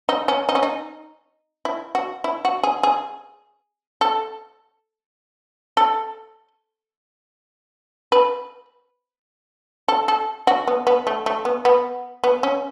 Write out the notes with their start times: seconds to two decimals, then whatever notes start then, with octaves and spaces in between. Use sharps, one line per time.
0.09 D#4
0.28 C#4
0.49 D#4
0.55 C#4
0.63 D#4
1.65 E4
1.95 F#4
2.24 E4
2.45 F#4
2.63 G#4
2.83 G#4
4.01 A4
5.77 A4
8.12 B4
9.88 A4
10.08 A4
10.47 F#4
10.67 B3
10.87 B3
11.07 A3
11.26 A3
11.45 B3
11.65 B3
12.24 B3
12.43 C#4